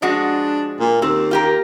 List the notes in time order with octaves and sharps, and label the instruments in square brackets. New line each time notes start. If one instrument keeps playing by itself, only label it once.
[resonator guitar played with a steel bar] F3 G#3 F#4 [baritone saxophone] D4
[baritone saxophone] A#2
[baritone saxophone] D#2 [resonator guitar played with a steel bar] C4
[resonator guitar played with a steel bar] F4 G4 A#4